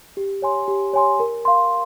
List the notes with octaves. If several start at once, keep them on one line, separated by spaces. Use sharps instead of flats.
G4
C#5 G#5 C6
G4
C#5 G#5 C6
A#4
F5 C6